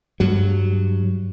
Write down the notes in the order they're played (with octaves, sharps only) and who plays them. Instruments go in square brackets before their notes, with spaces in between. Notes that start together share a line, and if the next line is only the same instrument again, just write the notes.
[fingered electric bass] G2 F#3